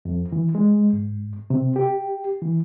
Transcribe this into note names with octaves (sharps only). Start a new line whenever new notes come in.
F2
E3
G#3
G#2
C3
G4
E3